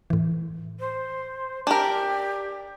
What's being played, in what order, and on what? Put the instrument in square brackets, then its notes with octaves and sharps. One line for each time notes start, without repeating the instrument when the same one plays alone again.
[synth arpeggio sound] A2 E3
[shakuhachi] C5
[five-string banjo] D4 A#4 [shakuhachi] G4 [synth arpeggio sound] G#5